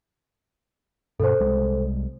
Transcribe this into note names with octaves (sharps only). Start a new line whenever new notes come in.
G2 B2 A4 C5
C2 G3 G#3